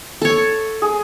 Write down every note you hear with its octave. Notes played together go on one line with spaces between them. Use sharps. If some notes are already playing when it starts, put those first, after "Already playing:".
A4 C#5
G#4